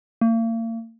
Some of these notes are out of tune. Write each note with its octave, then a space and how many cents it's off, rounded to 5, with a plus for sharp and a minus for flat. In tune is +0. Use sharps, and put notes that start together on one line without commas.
A#3 -40